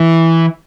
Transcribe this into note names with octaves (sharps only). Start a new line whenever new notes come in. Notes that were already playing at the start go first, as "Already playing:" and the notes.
Already playing: E3